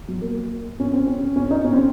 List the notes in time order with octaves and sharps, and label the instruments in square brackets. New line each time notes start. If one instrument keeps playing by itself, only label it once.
[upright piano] F#3
A#3
C#4
C4
C#4
C#4
D#4
C#4
C4